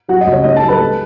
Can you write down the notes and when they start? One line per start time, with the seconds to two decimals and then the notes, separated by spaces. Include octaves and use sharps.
0.08 F#3 F#4 F#5
0.21 D#5
0.26 C#2
0.33 C#5
0.44 G#2 D#5
0.56 A4 A5
0.62 F#3
0.68 B4 B5
0.81 G#3